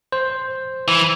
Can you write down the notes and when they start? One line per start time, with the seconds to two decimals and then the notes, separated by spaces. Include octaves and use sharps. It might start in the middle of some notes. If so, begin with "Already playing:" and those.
0.12 C5
0.88 E3